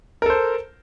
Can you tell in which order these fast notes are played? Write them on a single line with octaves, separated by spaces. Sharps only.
A#4 A4 C5